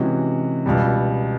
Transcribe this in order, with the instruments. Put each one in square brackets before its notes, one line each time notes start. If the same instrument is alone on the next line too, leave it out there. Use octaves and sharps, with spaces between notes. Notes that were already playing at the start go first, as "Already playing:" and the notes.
Already playing: [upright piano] C3 E3 G#3 C#4 F#4
C#2 B2 G3